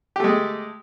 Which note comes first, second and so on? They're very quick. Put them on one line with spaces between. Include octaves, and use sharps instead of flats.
G4 A3 G#3